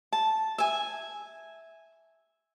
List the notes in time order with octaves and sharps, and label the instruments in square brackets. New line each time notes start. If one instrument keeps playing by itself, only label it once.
[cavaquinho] A5
E5 G#5